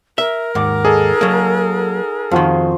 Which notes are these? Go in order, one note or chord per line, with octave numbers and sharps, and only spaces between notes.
A#4 E5
D#2 G#2 F#5 D6
D#4 G#4 A4
F#3 A#3
F2 D#3 F3 F#4 C6